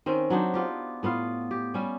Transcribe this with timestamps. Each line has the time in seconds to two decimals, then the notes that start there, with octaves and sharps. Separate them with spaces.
0.06 D#3 C4 C#4
0.30 F#3 D4 D#4 C5
0.54 B3 F4 G4
1.03 A2 B3 F4 F5
1.51 G4
1.74 G3 C#4